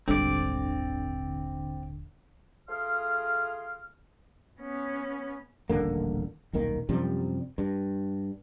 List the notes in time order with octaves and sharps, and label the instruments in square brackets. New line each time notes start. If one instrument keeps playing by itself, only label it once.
[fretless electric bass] D#1 G#1 G3 [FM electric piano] D3 [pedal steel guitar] C4 D5
[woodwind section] A3 F4 G#4 C6 F6
[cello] B3 C#4
[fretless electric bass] D#1 A1 D3 A#3
D#1 B1 D#3 A#3
F#2 C3 F3 G3
G2